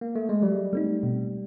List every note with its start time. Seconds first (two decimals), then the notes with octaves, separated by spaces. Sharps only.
0.01 A#3
0.15 A3
0.29 G#3
0.42 F#3 G3
0.73 A3 C4 D#4
1.03 B2